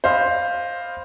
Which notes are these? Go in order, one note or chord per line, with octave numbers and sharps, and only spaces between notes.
C5 D5 D#5 F5 B5 C6